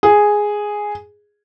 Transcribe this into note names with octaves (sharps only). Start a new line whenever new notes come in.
G#4